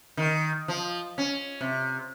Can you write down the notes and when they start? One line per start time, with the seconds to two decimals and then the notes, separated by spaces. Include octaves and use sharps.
0.17 D#3
0.68 F3
1.18 C#4
1.61 C3